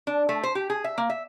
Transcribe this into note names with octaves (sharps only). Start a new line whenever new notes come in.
D4
A3
C5
G4
G#4
E5
A#3
E5